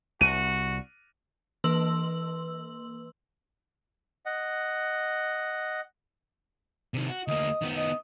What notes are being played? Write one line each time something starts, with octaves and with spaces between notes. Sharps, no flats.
C2 F#4 D#7
E3 A#3 B4 C6 E6 F#7
D#5 F#5
C3 D#3
F#4
D2 A#3 D#5
D#3 B3
D#5